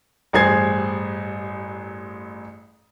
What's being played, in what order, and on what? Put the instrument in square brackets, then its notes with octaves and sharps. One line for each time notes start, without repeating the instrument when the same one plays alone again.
[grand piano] A1 G2 G#4 C5 G#6 C7